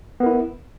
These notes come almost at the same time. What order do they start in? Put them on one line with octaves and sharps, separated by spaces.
B3 A#4 E4